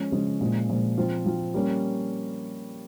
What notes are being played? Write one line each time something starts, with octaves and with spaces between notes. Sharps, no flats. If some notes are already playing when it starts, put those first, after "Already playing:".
Already playing: F3 G#3 C#4
C#3 F3 G#3 C#4
A#2 F3 G#3
A#2 F3 G#3
F3 C4 F4
F3 C4 F4
G3 A#3 C#4